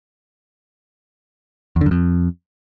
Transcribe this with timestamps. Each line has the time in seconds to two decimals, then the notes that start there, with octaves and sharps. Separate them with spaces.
1.76 E2
1.81 D3
1.86 F#2
1.91 F2